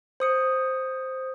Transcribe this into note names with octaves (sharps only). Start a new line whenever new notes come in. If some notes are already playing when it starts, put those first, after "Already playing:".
C5 D#6 C#7